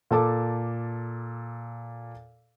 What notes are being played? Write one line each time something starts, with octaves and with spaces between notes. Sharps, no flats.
A#2 A4 A5 D6